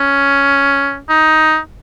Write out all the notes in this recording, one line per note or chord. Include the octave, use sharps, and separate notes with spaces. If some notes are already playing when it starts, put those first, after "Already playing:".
Already playing: C#4
D#4